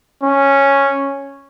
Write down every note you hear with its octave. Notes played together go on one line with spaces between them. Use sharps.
C#4